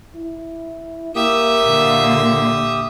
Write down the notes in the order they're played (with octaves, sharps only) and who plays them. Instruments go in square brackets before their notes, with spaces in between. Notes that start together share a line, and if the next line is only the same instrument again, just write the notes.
[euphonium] E4
[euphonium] A#3 [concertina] G4 D#6 [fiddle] E5
[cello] A#2 D3